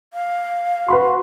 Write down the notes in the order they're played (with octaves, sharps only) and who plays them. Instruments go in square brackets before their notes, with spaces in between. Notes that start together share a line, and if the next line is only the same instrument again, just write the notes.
[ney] F5
[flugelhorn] F#4 [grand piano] B4 B5 C6